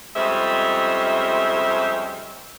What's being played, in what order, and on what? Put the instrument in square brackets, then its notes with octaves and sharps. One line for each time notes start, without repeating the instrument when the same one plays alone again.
[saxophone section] F2 G3 G#3 C#4 C5 E5